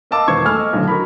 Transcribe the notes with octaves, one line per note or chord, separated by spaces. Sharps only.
A#4 D#5 F5 A5 D6 E6
E1 D#3 B3 C5 C#6 G#6
A3 G#5 E6 F6
D#5
B1 A2 D3 D#3
F#4 A#4 B5